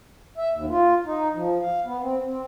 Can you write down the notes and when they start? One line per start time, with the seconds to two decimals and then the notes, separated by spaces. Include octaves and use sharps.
0.38 E5
0.53 D#2
0.70 F4
1.06 D#4
1.34 F3
1.60 F5
1.85 B3
2.02 C4
2.25 C4